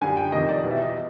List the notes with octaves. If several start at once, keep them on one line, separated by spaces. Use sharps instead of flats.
F#2 D3 G3 G#5
G5
F2 C3 D#3 D#5
D5
E2 B2 G3
E5
D#5